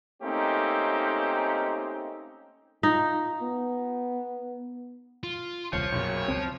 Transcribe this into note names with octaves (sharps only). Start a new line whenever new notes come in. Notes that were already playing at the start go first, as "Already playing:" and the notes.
A3 A#3 C4 C#4 D#4 G4
D#4 F4
B3
F4
D#1 C2 F3 C#5
B1 F#2 C#3 A#3
C#2 F3 C4